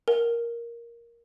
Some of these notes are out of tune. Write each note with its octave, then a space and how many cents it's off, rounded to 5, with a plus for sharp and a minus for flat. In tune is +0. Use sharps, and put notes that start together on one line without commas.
A#4 +5